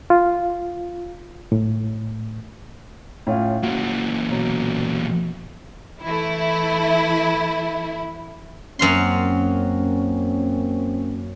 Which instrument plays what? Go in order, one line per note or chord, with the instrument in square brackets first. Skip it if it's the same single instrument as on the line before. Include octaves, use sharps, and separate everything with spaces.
[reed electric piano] F4
A2
[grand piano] A2 C#4 F4
[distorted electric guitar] A#2 E3 [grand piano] F#4
[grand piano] B2 F#3
[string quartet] E3 A3 [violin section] E4
[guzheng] F#2 F5 C6 [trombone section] A#3 C4 C#4